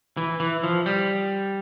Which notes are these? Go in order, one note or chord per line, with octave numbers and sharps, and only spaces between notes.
E3
E3
F3
G3